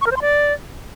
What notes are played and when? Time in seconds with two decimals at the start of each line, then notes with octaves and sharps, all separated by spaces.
0.01 C#6
0.06 A#4
0.11 C5
0.16 C6
0.22 D5